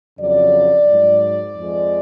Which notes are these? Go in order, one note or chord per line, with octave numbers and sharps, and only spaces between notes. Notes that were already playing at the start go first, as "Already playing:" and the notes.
F2 C#3 F#3 D5
G#2 F#3
F2 F3 G#3